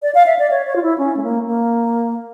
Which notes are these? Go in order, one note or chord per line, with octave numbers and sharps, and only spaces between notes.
D5
F5
E5
D5
C#5
C#5
F4
E4
C#4
A3
A#3
A#3